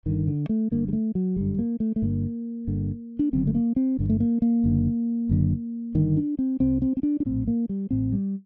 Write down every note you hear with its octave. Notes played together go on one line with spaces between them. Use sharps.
G1 G2 D3 D#3
D3
A3
G1 G2 D3 A#3
G3
A3
F#3
G1 F#2 D3 G3
A#3
A3
A3
G1 G2 D3 A#3
G1 G2 D3
D4
F#1 F#2 D3 C4
A3
A#3
C4
G1 G2 D3
A3
A#3
A#3
F#1 F#2 D3
F#1 F#2 D3
G1 G2 D3 D#3
D4
C4
C2 C3 C4
C4
C4
D4
D4
A#1 A2 C4
A#3
G3
A1 A2 C4
G3